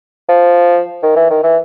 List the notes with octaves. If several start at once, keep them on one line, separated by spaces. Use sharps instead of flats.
F3
D#3
E3
D#3
E3